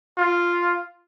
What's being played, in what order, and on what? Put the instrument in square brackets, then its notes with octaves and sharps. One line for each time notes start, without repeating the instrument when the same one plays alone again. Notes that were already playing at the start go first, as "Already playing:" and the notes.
[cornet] F4